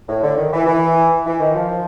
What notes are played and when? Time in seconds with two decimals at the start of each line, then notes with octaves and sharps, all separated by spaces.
0.08 A2
0.23 D3
0.37 D#3
0.52 E3
0.66 E3
1.26 E3
1.40 D#3
1.55 F3